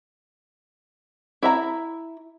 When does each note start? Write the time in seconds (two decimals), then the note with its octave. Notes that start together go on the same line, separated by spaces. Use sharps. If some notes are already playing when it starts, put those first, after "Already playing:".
1.43 E4 E5 A#5